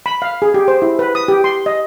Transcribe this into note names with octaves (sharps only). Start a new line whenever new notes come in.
B5
F5
G#4
G4
C5
E4
B4
D#6
G4
C6
D#5